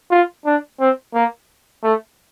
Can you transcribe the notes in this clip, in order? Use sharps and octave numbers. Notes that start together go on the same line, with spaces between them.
F4
D4
C4
A#3
A3